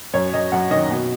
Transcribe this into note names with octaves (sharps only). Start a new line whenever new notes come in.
F#2 C#5
F#2 D#5
F#2 F#5
D#3 D#5
B2